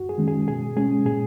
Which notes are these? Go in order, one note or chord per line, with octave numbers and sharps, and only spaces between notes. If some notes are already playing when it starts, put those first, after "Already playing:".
Already playing: F#2 F#4
G#4
D#3 G#3 C#4
G#4
B2 G#4
G#3 C#4 G#4
A#2 G#4